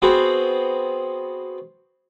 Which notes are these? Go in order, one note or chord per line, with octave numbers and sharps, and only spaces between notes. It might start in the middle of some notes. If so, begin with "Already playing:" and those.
B3 C4 F#4 G#4 C5